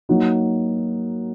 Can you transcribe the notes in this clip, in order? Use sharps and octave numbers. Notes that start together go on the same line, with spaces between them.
F#3 A#3 D#4 F#4